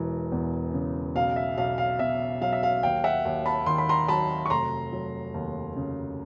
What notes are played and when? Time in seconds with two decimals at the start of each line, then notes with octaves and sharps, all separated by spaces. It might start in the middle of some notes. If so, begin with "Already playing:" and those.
Already playing: E1 E3
0.32 E2
0.74 C#3
1.15 B1 F5
1.36 E5
1.58 B1 F5
1.78 F5
1.99 B2 E5
2.41 F#3 F5
2.53 E5
2.63 F5
2.83 D#2 F5 G5
3.04 E5 F#5
3.25 D#2
3.46 A5 B5
3.66 D#3 C6
3.78 B5
3.89 A#5 C6
4.08 F#3 A5 B5
4.46 C#6
4.50 F1 A#5 C6
4.92 F#3
5.34 D#2
5.76 C#3